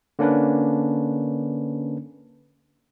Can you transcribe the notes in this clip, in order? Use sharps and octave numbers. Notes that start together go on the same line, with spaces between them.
D3 A#3 C#4 D4 B4